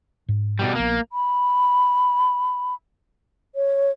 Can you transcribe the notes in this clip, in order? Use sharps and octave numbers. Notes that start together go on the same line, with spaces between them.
G#2
B2 G3
A#1 A#3 B3
B5
C#5